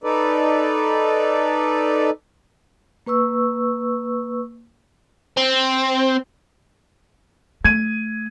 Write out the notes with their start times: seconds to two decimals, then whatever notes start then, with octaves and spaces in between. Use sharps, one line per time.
0.04 D#4 A4 B4 D5
3.06 A#3 B4 C#6 E6
5.37 C4
7.64 A3 G#6 D#7